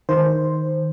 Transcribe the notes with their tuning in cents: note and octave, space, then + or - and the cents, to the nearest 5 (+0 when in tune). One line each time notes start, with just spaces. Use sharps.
D#3 +0 C5 +0